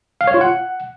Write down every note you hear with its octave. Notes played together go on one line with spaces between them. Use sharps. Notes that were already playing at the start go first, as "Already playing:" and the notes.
F5
C#5
F4
F#5